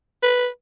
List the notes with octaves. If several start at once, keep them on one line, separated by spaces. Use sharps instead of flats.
B4